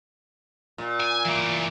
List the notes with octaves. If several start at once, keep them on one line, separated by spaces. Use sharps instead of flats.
A#2
G#5
E3 A#3